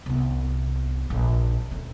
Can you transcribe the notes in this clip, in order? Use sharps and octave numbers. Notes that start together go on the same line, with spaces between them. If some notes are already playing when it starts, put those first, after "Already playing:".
C2 B3
A#1
D2 C#4